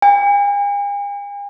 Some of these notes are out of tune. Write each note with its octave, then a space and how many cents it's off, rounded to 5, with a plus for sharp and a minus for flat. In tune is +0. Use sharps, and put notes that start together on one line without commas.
G#5 -45